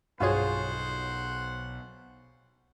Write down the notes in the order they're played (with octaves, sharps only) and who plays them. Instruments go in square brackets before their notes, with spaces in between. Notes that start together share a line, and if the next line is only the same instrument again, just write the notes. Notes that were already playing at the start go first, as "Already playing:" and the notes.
[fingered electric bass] B1 [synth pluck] G2 C#5 [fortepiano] F4 F#4 G#4 [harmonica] C5 F#5